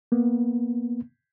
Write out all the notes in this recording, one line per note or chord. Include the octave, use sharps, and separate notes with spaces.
A#3 B3